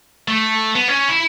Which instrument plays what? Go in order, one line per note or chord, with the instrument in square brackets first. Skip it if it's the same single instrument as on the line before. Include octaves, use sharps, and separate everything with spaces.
[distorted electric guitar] A3
B3
C#4
E4